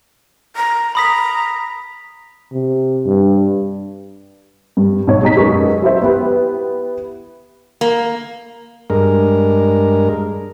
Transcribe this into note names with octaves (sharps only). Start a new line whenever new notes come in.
A#5
A#5 B5 D#6 B6
C3
G2
G2
B1 B2 C#5
G#3 D#4 A#5 B6
F#2 G#3 D#4 B4 C#6
F#3 E4 C5 E5
B3 E4 G4 B4
A#3
G2 G#3 A#4